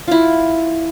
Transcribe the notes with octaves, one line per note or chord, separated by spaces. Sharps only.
E4 F4